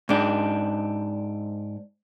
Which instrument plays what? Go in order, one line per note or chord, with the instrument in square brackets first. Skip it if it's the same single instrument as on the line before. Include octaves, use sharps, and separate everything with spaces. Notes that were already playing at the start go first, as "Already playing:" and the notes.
[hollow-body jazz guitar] G#2 D4